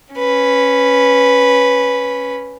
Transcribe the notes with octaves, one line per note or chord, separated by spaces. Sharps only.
C#4 B4